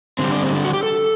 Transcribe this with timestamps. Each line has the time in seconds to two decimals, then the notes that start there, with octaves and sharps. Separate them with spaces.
0.19 D3 G3 C4
0.31 D4
0.43 C4
0.55 D4
0.65 F#4
0.73 G4
0.83 A4